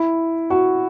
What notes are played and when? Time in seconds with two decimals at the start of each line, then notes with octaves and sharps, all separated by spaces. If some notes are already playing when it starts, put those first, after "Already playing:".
Already playing: E4
0.50 F#4